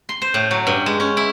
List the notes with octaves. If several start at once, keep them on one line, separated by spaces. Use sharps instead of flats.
C6
C5
A2
F#3
G2
G#3
C#4
E4